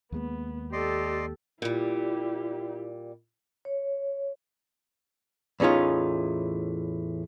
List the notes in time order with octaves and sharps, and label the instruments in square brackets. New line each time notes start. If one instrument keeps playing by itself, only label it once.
[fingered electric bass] D#2 G#3 A#3 [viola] B3
[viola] G4 A4 [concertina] D5 D#5 C6
[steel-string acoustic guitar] A#2 G3 [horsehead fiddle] E4 G4
[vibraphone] C#5
[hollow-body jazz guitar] E2 A2 C#4 D#4 F4